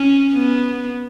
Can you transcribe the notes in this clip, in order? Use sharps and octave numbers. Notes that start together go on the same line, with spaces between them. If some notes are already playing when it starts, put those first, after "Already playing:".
Already playing: C#4
B3